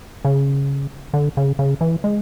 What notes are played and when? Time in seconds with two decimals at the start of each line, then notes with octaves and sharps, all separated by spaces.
0.25 C#3
1.14 D3
1.37 C#3
1.59 C#3
1.81 E3
2.04 G#3